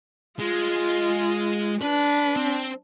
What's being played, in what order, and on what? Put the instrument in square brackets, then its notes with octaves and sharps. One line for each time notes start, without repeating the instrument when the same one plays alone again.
[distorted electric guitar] G#3 [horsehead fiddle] F4
[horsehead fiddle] D4 [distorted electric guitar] B4
[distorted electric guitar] C4